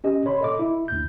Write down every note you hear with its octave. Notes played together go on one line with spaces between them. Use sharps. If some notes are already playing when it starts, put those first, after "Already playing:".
C#4 G4 D#5
C#5 B5 C6
A4 D#5 D6
E4
D2 G6